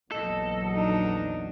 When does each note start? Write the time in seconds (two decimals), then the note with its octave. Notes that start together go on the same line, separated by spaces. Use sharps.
0.12 A#1 E2 F#3 A4 D#5
0.74 D4 D#4